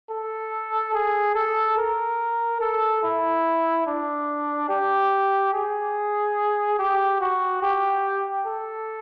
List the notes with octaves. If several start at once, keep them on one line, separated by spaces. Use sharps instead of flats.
A4
G#4
A4
A#4
A4
E4
D4
G4
G#4
G4
F#4
G4
A4